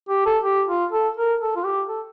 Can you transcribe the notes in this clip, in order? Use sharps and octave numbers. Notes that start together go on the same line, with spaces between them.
G4
A4
G4
F4
A4
A#4
A4
F4
G4
A4